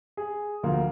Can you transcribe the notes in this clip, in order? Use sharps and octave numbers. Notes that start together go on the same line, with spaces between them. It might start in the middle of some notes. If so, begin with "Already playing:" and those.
G#4
D2 F3 A#3